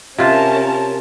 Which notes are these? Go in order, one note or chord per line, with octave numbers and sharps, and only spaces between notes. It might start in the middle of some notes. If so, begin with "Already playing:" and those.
C3 C#4 F4 A#4 A5